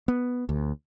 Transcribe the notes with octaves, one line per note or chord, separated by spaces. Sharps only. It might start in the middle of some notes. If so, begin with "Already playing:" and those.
B3
D2